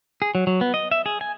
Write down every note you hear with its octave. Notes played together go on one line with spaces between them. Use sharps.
G#4
F#3
F#3
B3
D#5
E5
G#4
G#5